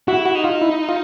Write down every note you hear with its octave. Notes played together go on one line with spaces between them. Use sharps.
E4 F#4
F#4
D#4
F4
E4
F4